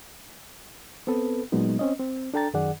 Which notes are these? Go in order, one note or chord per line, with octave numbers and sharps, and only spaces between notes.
B3 C4 A4 B4
A#2 F#3 G#3 B3 D#4
C4 C#4 D#5
C4
D4 A4 G5 A#5 A6
F#2 D#3 G#4 D5 F#5